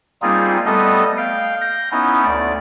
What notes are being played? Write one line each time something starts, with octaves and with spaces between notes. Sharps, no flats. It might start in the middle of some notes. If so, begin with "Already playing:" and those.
G3 A#3 C4 D#4 F4 G#4
G3 A3 B3 A4 D#5
F5 G5
G6 A#6
B3 C#4 D#4 E4
D2 D5